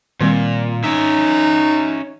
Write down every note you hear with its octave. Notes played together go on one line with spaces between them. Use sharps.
A#2 D#3 G3 C4
C#4 D#4 E5